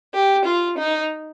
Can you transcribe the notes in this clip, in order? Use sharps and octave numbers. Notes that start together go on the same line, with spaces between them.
G4
F4
D#4